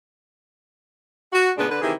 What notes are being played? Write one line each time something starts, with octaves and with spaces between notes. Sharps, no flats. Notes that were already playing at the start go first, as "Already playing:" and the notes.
F#4
A#2 C#3 G#3 B3 D4
D3 B4
C3 D#3 E3 E4 G4 G#4